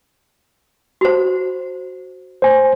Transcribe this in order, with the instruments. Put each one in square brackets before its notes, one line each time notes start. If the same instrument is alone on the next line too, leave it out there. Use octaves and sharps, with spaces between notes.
[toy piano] F#4 C5
[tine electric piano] C5 G#5